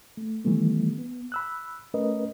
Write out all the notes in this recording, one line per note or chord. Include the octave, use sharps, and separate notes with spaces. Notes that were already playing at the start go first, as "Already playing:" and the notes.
A3
D#3 E3 G3 A3 B3
B3
B5 E6 F#6
A3 C#4 A#4 B4 D#5